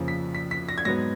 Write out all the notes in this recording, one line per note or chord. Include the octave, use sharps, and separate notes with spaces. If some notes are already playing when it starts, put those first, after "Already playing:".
Already playing: F2 C#3 F3 A#3
B6
B6
B6
A#6
G#6
G#2 F#3 B3 A#6